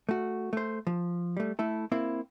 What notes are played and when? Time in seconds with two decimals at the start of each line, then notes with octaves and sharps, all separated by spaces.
0.09 A3 F#4
0.53 A3 C5
0.87 F3
1.37 G3 A3
1.59 A3 E4 A4
1.92 A#3 C4 E4